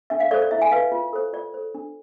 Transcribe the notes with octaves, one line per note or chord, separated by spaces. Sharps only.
D4 E5
F5
A4 C5 D5
D5
E4 E5
G#5
B4 F5
F4
A4 C5
F4 D5
A4 C5
D4